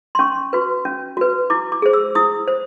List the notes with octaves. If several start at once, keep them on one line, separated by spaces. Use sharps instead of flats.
C6
C#4 C#6
F#4 B4
C#4
F#4 B4
E4 D6
D6
G#4 C5
E6
E4 D#6
C5